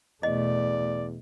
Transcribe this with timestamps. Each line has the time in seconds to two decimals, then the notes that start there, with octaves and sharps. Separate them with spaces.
0.23 E2 B2 A3 D5 D#5